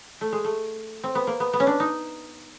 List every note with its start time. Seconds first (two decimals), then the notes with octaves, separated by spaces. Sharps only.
0.21 A3
0.32 G#3
0.44 A3
1.04 C4
1.15 B3
1.27 A#3
1.40 B3
1.53 B3
1.60 C#4
1.67 D4
1.80 D#4